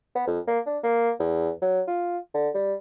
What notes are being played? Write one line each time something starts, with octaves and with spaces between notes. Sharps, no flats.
B3
F2
A#3
D4
A#3
E2
F#3
F4
D3
G3